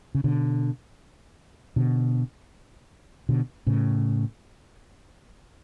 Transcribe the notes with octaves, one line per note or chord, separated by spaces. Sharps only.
C#3
B2 D3
B2 D3
B2 D3
A2 C#3